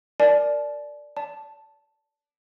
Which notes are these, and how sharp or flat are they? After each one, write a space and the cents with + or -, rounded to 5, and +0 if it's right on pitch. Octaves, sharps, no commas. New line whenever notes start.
A#4 +0 D5 +0 A5 -40
D5 -40 A5 +0